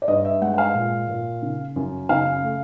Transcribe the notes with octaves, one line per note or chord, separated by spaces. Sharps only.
D5
G2 D#5
E5
G#3 F#5
F#5
F5
A#2
A#2
C#3
F#2
C#3 F5
A3